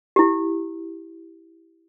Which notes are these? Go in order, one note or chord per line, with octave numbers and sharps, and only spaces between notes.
E4 G4